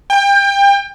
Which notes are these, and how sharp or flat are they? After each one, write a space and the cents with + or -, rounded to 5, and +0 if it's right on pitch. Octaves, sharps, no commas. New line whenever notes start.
G5 +30